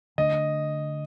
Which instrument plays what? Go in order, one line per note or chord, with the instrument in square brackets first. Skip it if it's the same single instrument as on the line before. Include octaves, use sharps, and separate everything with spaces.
[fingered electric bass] D3 A3 D4 [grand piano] D#5